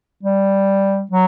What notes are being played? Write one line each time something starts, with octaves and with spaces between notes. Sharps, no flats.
G3
F#3